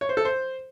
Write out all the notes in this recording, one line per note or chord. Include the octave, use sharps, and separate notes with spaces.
C#5
C5
A4
C5